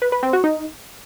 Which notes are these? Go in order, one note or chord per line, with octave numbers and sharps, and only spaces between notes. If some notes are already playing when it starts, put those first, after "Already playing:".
B4
B4
C4
F#4
D#4